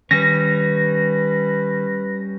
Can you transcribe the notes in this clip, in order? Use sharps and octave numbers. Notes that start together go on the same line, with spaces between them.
D#3 G3 C#4 B4 A#6